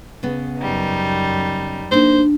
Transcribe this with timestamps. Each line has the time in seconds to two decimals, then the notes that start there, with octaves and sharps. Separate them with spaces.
0.23 C#3 B3
0.60 F#2 G3 D#4
1.92 A#3 D4 D#4 C5